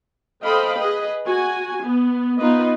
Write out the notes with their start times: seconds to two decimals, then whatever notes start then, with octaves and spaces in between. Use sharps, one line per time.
0.43 A4 C5 D#5 F5 G5 B5
0.77 G#4 B4 D#5
1.26 F#4 G#5
1.83 B3
2.39 B3 D#4 F4 B4 D#5